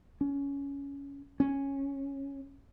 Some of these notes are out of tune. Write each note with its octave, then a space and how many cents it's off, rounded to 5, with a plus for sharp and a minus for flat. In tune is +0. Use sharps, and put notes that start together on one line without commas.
C#4 +15
C#4 -5